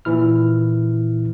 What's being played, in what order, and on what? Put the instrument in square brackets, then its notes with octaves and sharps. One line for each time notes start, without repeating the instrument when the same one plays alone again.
[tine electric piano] A#2 E3 E4 F6